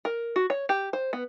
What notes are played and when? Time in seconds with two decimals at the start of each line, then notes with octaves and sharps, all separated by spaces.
0.05 A#4
0.36 F#4
0.50 C#5
0.69 G4
0.93 C5
1.13 B3